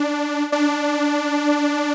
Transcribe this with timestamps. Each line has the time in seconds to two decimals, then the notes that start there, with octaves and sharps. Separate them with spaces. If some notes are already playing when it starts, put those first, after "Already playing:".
Already playing: D4
0.52 D4